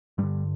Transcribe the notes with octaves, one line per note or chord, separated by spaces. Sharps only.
G2 D3 G3